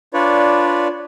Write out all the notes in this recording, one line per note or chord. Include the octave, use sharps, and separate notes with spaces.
D4 F4 B4 C#5 D5